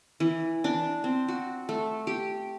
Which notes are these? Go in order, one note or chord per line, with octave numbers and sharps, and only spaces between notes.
E3
D4
C4
F#4
A3
G4